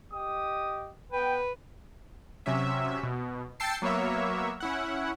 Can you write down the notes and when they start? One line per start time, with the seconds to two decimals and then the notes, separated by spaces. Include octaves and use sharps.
0.12 G4 D#5 D#6
1.12 B3 B4 G5
2.46 C3 F#3 C#4 E5
3.03 B2
3.60 G5 A5 E6 A6 C7 C#7
3.82 F#3 A#3 B3 C#5 E5
4.60 C#4 E4 F#5